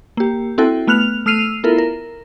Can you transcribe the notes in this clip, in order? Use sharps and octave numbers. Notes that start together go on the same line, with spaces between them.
A#3 G4
C4 E4 F#4 A4 G5
A3 B3 F6 F#6 F7
A3 E6 F6 C7 D#7 F7
B3 E4 F4 A4 A#4
A#4